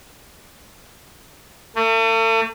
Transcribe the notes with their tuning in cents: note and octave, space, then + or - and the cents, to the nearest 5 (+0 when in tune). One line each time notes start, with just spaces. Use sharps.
A3 +40